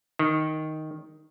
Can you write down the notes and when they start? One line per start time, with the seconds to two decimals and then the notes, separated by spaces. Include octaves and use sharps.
0.19 D#3